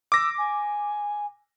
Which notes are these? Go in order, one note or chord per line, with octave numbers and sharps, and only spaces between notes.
D6 E6 A#6
G#5